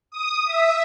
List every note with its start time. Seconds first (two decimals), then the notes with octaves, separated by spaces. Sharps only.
0.11 D#6
0.45 E5